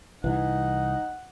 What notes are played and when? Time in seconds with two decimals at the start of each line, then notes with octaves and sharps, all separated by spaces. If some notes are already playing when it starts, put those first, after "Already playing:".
0.24 C2 E3 D#4 F#5